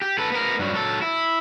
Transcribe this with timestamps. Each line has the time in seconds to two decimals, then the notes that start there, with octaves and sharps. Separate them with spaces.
0.02 G4
0.18 A4 B4
0.32 B3 A#4
0.59 G2 F#3
0.74 F#3 A4
1.02 E4